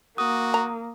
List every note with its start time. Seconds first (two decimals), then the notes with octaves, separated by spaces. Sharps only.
0.18 A#3 F#4 D#6
0.54 A#5